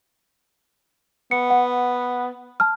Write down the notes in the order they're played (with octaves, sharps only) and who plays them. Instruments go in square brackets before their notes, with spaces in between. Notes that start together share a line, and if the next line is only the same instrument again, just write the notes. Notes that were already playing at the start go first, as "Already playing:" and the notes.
[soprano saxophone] B3 [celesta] C#7
[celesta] F#5
A5 F6